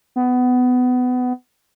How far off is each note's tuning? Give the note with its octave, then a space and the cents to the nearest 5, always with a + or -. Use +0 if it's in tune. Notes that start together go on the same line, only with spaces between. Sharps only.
B3 +20